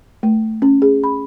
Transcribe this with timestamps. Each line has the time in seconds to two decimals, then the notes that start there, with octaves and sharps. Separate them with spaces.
0.23 A3
0.62 C#4
0.82 G#4
1.04 B5